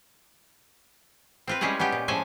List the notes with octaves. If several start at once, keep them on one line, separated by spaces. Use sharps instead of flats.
C4 F4 B4
G3 G#3 C#4 E4 F4 G#4
B3 C#4 D#4 G4
A#2
A2 F3 G#3 C#4 A4 G#5